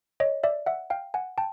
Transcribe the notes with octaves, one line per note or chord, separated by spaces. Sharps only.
C#5 D#5
D5 E5
E5 F#5
F5 G5
F#5 G#5
G5 A5